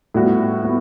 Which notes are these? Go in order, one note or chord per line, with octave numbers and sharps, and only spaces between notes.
A2 G3 B3 F#4
B3 F#4